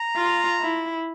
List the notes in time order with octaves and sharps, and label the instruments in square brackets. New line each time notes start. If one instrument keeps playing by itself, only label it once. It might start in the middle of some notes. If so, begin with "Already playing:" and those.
Already playing: [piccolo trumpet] A#5
[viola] F4
E4